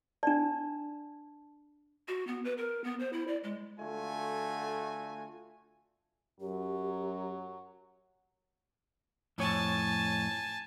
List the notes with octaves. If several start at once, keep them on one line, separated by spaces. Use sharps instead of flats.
D4 D5 A5
F#4
B3
B4
A#4
B3
C5
E4
D5
G#3
D3 A3 F4 F#4 G#5
F#2 F#3 G4
F2 A2 C#5 G#5 A5